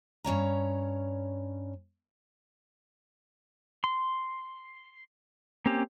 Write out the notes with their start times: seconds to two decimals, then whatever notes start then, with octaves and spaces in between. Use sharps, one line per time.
0.24 G2 C#4 C#5 A#5
3.84 C6
5.66 A#3 C4 C#4 G4